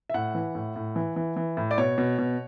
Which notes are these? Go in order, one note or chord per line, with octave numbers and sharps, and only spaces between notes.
E5
A2 F#5
E3
A2
A2
E3
E3
E3
A2
D5
B2 C#5
B2
B2